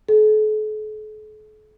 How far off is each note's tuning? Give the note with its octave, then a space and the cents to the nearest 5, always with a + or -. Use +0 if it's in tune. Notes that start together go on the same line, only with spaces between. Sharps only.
A4 -45